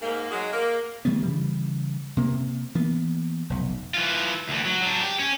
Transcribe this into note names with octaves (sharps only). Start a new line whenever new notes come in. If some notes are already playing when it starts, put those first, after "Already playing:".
G#2 A#3
F#3 G#3
A#3
D#3 G3 A3 B3
C#3 E3 G3
C3 A#3 C4
E3 A#3 B3
F1 B1
E3 F4
D2 E3
F#3
F#3 D4
G4
C#4